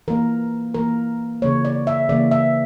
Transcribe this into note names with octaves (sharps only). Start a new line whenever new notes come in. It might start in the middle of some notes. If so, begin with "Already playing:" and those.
E3 A#3 A#4
E3 A#3 A#4
C#3 E3 A#3 C#5
D5
E5
C#3 E3 A#3 D5
E5